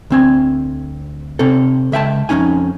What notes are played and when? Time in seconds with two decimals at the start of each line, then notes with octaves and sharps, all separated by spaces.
0.10 D2 C4 G#5
1.39 C3 C4 A4
1.92 C#2 E5 G5 A5
2.29 F2 F3 C#4 D#4 G#5